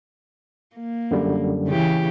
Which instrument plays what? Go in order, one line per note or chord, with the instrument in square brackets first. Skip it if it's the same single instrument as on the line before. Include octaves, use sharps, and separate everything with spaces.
[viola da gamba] A#3
[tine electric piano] F#2 D3 G3
[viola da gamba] C#3 E3 G4